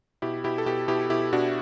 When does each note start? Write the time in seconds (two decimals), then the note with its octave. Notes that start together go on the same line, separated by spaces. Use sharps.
0.22 B2 E4 G4
0.44 B2 E4 G4
0.58 A4
0.66 B2 E4 G4
0.88 B2 E4 G4
1.10 B2 E4 G4
1.33 B2 D4 F#4